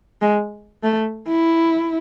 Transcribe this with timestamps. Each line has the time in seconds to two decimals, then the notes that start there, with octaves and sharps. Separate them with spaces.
0.22 G#3
0.83 A3
1.28 E4